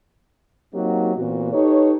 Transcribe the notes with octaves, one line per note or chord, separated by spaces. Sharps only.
F#3 A#3 C4 D#4 F#4 G4
A#2 E3 B3 C4 F#4
D#4 G4 A4 B4 C#5